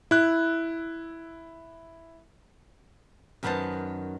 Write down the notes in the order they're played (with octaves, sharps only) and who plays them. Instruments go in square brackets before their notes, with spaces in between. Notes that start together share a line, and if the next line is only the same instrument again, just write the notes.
[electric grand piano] E4 F#6
[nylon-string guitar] F#2 D#3 B3 C4 C5 A5